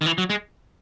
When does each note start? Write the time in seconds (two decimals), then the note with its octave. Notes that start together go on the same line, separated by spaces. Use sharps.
0.01 D#3
0.06 E3
0.18 F#3
0.30 G#3